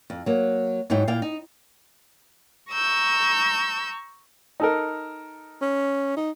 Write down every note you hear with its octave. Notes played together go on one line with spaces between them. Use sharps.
F2
F#3 A#3
G#2 F#3 D#4 E4 G5
A#2 E4 F5 G5
D#4
A#5 C#6 E6 G6
D#4 A4 A#4
C#4
D#4